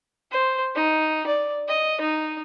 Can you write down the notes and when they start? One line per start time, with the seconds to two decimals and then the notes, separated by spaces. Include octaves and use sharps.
0.32 C5
0.76 D#4
1.26 D5
1.68 D#5
2.01 D#4